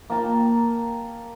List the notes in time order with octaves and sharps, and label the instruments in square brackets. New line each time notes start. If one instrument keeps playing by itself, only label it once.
[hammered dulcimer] A#3 A#4 G5 A5